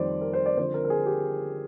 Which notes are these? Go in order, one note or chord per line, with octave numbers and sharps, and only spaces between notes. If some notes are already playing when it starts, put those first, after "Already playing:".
Already playing: F2 D#3 G3 C5 D5
A#4
C5
D5
D3 F3 C4 C5
A#4
A#4
G#4
G4